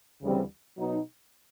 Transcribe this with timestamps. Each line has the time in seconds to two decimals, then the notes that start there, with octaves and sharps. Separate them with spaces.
0.21 D2 C#3 E3 G3 C4
0.78 B2 F#3 B3 D#4